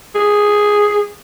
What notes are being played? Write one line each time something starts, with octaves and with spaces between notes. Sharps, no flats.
G#4